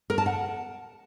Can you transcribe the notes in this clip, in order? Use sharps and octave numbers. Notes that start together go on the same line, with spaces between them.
A#4
A5
F#5